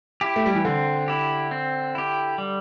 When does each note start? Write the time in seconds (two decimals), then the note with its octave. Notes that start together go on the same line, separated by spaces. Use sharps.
0.21 E4 G4
0.36 A3
0.46 G3
0.55 E3
0.65 D3 C4
1.08 E4 G4
1.51 C4
1.95 E4 G4
2.38 G3